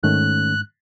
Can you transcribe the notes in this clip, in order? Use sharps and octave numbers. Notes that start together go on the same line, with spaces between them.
G#2 D#3 A3 C#4 F#6